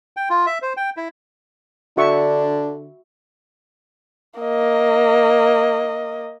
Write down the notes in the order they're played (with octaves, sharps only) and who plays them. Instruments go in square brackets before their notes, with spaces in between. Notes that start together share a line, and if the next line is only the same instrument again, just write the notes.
[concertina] G5
F4
E5
C5
G5
E4
[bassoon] D3 [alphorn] D4 [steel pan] F#4 E5 C#6
[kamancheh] A#3 D#5